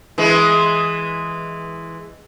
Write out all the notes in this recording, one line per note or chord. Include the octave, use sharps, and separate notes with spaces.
E3 G#3